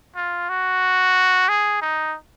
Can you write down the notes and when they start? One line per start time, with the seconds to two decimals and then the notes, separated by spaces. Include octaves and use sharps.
0.16 F4
0.49 F#4
1.49 G#4
1.81 D#4